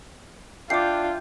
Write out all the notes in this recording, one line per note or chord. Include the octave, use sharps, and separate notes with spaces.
D4 F4 E5 G5 D6 C7